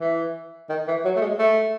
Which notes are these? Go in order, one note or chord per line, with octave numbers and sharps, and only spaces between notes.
E3
D#3
E3
F#3
A3
G#3
A3